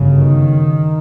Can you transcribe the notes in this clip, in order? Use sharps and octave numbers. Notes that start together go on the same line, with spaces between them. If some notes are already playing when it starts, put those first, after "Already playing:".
Already playing: G1 F#2 C#3
D#3